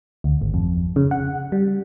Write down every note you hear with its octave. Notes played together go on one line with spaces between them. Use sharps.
D2
G#1
F2
C#3
F#5
G3